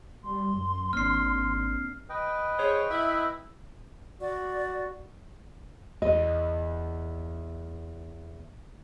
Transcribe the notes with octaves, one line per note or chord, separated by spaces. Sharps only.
G3 C6
F#2
G#1 A#3 C4 D4 F6 C7
B4 D#5 G5
G#4 C5 C#5
E4 E5
F#4 D5
E2 D#5